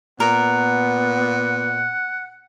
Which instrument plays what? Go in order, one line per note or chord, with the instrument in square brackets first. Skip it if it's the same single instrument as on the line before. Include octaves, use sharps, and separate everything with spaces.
[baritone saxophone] A#2 [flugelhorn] B3 [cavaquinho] A#4 [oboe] F#5